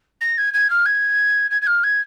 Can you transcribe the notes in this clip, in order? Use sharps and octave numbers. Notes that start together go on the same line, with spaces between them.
A#6
G#6
G#6
F6
G#6
G#6
G#6
F6
G#6